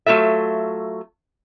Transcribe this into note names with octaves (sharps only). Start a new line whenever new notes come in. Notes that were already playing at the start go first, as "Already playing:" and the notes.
F#3 A3 F4 A4 E5